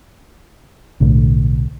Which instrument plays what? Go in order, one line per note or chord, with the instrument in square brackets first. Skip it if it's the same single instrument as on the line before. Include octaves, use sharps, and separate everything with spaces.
[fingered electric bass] B1 A2 D3